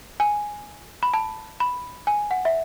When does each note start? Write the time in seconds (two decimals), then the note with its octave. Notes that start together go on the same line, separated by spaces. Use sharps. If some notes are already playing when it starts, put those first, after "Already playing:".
0.20 G#5
1.03 B5
1.14 A5
1.60 B5
2.07 G#5
2.31 F#5
2.45 E5